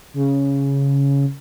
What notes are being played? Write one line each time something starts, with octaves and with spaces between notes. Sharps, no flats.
C#3